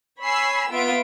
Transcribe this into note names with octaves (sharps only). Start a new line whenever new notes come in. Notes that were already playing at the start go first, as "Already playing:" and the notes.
C#5 G#5 B5 E6 C7
B3 F4 E5 D7